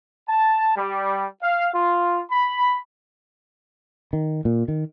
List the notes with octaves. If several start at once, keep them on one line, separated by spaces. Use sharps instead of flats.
A5
G3
F5
F4
B5
D#3
A#2
D#3